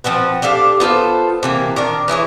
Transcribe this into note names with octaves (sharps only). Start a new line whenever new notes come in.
F3 C4 F#4 B4
D4 G4 A4 F5
B3 F4 A4 C5
C3 E3 A#3
D#3 D4 A#4
E3 E4 G#4 C#5